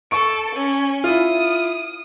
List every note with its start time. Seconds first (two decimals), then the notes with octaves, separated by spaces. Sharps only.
0.11 A4 A5 C#6 D7
0.55 C#4
1.04 E4 F4 D#6